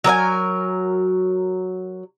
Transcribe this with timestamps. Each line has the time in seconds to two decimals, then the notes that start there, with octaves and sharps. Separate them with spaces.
0.04 F#3 A#4 D5 G#5